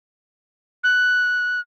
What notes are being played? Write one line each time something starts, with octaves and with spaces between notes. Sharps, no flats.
F#6